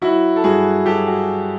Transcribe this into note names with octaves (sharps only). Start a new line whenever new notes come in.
F#3 E4 F#4
A4
G2 F#4 G#4
F#3 G4 A4
F#4 G#4